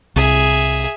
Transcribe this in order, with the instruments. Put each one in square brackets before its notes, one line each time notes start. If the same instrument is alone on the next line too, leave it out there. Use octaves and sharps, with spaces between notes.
[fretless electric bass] C2 [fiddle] G#4 E5